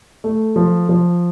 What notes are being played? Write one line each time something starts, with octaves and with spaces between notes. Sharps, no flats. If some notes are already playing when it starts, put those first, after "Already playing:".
A3
F3
F3